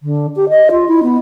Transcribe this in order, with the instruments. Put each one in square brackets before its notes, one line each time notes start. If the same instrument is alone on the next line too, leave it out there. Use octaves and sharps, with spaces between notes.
[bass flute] D3
G4
D#5
F4
E4
B3